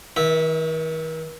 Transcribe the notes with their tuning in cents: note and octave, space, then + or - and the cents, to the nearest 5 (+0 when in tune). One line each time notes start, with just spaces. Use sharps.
D#3 +40 E5 -15